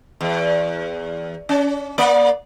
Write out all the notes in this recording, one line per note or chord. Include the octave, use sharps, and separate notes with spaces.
E2
C#4
A#3 D5